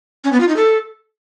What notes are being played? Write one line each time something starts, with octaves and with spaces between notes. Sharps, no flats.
C#4
B3
F4
D#4
A4